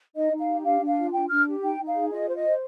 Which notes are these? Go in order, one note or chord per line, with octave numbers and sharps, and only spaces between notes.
D#4 D#5
D#4
F5
G4
D4 F5
D4
F5
F4
D4 G5
D4 F6
G4
D#4 G5
D#4
F5
G#4
F4 D#5
C5
D#5
C5